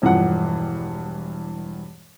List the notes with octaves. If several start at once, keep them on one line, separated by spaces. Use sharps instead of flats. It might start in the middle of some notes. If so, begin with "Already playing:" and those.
E1 G2 E3 F3 F#5